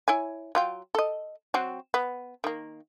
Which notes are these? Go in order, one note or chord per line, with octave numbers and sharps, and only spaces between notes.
E4 C#5 G#5
F#3 F4 G5
A4 D#5
F#3 C4 F#4
B3
D#3 A#3